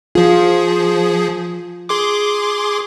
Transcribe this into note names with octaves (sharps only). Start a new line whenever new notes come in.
F3 F4 G#4
G#4 C6 D6